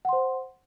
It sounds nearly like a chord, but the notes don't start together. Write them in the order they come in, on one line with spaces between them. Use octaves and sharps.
F#5 C6 C5